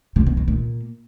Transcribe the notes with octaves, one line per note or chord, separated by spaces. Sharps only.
C3
B2
B2
A#2